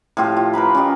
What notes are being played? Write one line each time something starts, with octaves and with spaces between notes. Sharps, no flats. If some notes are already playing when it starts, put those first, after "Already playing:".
A2 F3 F4 G4
F4
A#4 B4 A#5 B5
C#4 F4 G4 D#5